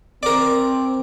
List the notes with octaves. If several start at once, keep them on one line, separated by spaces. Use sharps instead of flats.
C4 A#4 D5